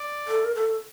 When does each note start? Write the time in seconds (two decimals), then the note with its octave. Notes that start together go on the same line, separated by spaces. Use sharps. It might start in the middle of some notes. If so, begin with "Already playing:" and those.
Already playing: D5
0.27 A4
0.44 A#4
0.55 A4